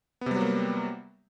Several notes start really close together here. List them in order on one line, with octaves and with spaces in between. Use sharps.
B3 C3 G3 F#3 A#3